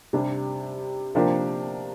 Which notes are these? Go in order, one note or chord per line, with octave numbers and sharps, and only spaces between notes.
C3 G3 D4
C3 F3 A#3 D4 G4